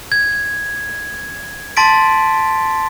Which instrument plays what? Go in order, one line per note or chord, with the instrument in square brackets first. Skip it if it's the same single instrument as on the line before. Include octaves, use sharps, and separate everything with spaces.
[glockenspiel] G#6
A5 C6 A6 B6 D7